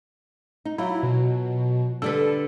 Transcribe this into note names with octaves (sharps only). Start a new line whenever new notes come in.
D#4
F#3 E4 F4
B2
D3 G3 A4 B4